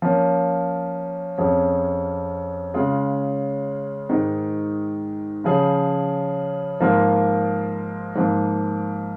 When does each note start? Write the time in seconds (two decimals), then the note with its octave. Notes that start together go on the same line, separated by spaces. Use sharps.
0.02 F3 A#3 C#4
1.38 F2 F3 C#4 G#4
2.74 C#3 G#3 C#4 F4 G#4
4.09 G#2 D#3 G#3 D#4
5.44 C#3 F3 C#4 G#4
6.80 G#2 F3 A#3 F4 A#4
8.15 G#2 F3 A#3